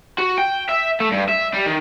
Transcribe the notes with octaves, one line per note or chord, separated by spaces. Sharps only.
F#4
G5
E5
A3
G2
E5
G3
D#3